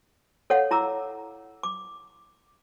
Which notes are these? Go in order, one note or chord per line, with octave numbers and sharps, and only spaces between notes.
A4 C#5 F5 F#5
E4 A#5 D6 E6
D6